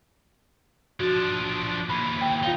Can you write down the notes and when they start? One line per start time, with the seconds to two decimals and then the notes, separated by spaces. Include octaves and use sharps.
1.00 F3 D4 F#4
1.90 D#2 E3 B5 C7
2.21 G5
2.43 D#4 F4 F5 G7